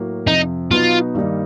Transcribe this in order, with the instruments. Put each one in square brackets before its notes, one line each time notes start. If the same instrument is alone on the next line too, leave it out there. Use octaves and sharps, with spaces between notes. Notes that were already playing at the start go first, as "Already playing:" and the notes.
Already playing: [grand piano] A2 F#3 A#3
[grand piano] F2 C3 F3 [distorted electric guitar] D#4
[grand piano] B2 F#3 B3 D#4 F#4 [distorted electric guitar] F4
[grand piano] G2 D#3 G3 A#3 D#4